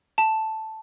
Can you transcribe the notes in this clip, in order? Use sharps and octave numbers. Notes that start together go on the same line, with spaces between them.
A5